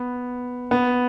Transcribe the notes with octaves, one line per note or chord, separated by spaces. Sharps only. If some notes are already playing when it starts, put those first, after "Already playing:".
Already playing: B3
B3